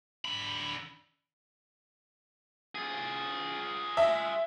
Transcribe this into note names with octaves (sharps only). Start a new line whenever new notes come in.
D3 B5
F4 G#4
E5